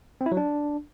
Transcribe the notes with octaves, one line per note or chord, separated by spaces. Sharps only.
C4
E4
F#3
D4